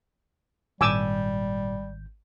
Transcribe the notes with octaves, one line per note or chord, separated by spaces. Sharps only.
G#1 A#2 G3 G#5 D6 E6 G6